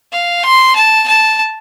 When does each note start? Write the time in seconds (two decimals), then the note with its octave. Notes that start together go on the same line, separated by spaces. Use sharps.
0.12 F5
0.44 C6
0.75 A5
1.07 A5